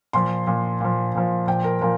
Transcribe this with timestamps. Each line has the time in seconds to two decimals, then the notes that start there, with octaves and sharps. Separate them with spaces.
0.13 A#2 F3 C6
0.47 A#2 F3
0.81 A#2 F3
1.15 A#2 F3
1.47 A#2 F3 G5
1.64 A#4
1.81 A#2 F3 A#4